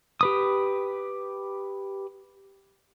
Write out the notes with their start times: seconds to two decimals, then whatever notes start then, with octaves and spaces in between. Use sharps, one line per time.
0.21 G4 B4 D#6